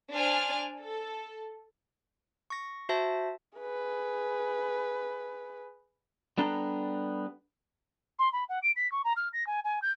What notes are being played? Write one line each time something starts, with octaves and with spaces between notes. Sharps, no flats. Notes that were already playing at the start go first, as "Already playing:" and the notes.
D4 C5 D5 G#5 F6
A4
C#6 A#6
F#4 C5 E5 A5 A#6
G#4 B4
G3 B3 D4 A4 A#5
C6
B5
F#5
D7
B6
C#6
A#5
F6
A#6
G#5
G#5
G6